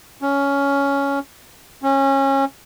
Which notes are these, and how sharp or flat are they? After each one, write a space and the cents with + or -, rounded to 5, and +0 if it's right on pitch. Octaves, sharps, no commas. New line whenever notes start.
C#4 +10
C#4 -25